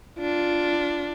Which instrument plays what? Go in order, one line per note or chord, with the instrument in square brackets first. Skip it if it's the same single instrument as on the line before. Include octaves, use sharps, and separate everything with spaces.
[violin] D4 [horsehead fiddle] F4